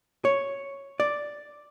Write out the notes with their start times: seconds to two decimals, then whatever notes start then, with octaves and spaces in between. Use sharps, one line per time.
0.25 C#5
1.00 D5